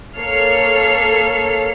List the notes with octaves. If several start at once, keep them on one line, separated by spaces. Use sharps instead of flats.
A#3 A4 C#5 F6 C7 C#7